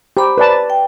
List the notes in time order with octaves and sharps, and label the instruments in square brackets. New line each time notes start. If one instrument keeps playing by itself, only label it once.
[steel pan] G4 [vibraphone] C5 A#5 B5
[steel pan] B4 D5 A5
[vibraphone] G5